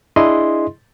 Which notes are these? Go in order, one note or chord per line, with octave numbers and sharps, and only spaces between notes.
D4 E4 G#4 D#5 C6